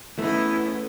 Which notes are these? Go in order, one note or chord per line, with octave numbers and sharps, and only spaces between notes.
E2 A3 B3 C#4 D#4 E4